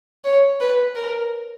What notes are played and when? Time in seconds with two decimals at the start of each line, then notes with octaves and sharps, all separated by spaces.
0.24 C#5
0.60 B4
0.95 A#4